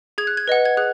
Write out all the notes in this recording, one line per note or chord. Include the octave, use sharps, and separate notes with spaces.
G#4 G#6
F#6
G#6
B4 D#5 F#5
G#6
G#4 F#6